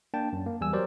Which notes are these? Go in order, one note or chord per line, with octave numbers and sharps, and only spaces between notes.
A#3 D4 G5 A5
F#2
A#3
E2 G3 G#5 E6
F#3 G4 A#4 C5 D5